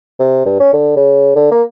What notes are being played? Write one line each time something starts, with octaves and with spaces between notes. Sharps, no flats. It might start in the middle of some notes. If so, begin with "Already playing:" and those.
C3
G2
C#4
D3
C#3
D3
A#3